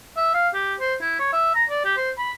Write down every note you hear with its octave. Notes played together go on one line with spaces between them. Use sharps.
E5
F5
G4
C5
E4
C#5
E5
A#5
D5
G4
C5
B5